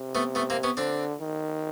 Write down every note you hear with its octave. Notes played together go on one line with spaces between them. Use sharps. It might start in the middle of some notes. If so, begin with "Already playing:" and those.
Already playing: C3
A3 B3
A3 B3
A#3 C4
B3 C#4
D3 C4 D4
D#3